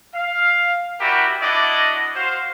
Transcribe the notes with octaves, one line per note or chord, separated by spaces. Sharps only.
F5
E4 F#4 G4 A#4 D5 G5
D4 E4 F#4 D5 D#5
F#4 C5 F5